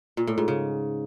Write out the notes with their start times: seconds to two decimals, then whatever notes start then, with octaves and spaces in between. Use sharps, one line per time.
0.17 A#2
0.27 A2
0.38 G#2
0.48 C#3